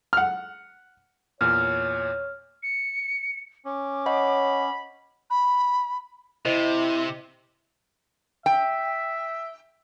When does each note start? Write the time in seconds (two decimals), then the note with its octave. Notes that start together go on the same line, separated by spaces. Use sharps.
0.13 F#5 F6
1.41 E2 A#2 C#5 F6
2.63 C#7
3.65 C#4 D6
4.06 C#5 D#5 F#5 B5
5.30 B5
6.45 C3 E4 C5 D#5
8.46 E5 G5